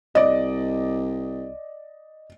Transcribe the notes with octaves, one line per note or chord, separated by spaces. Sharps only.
C2 D5 D#5